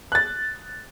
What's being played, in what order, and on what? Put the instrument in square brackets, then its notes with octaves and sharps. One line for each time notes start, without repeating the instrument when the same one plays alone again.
[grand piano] F#6 A6